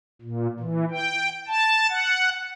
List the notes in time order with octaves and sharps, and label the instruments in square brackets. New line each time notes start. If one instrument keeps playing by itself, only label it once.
[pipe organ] A#2
E3
G5
A5
F#5